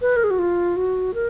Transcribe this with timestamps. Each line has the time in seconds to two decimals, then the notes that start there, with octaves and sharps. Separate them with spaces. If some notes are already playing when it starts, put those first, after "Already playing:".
0.01 B4
0.16 A#4
0.24 G#4
0.30 F#4
0.39 F4
0.76 F#4
1.14 A#4